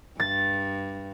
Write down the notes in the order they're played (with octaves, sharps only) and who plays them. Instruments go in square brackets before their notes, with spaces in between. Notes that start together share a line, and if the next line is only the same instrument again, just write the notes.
[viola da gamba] G2 [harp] A6